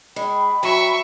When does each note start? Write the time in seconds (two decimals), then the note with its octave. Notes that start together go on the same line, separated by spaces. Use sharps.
0.16 G#3 G5 B5
0.63 F#3 E5 C#6